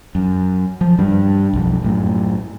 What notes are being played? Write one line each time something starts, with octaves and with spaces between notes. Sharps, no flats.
F#2
F3
G2 G3 D4
B1 F2
F#2 A2